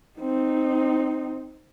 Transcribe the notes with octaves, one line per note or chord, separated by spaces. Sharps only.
C4 D#4